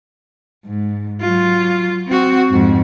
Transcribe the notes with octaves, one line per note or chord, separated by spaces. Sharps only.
G#2
F#3 F4
C4 F#4
F2 G#2